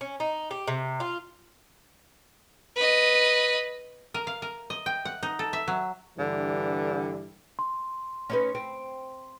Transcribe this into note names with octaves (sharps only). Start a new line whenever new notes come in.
C#4
D#4
G4
C3
F4
B4 D#5
A#4
F5
A#4
D#5
G5
F#5
D#4
A4
E5
F#3
G2 D3 E3 G3
C6
C#4 D#4 B4
C4